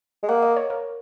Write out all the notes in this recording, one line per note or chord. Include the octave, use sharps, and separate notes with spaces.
G#3
A#3 F#5
D#5
C#5
A#4